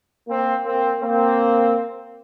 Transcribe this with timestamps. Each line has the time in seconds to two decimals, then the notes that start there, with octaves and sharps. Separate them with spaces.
0.28 A#3 C4
0.64 A#3 C4
1.01 A#3 C4